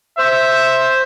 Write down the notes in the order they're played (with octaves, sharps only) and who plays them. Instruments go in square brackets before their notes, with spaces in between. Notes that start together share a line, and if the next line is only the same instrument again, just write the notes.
[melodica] C5 [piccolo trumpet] E5